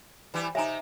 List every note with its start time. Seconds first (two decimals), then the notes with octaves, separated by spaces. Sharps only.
0.34 E3 G3 E4
0.55 C3 D#4 E5 G#5 A#5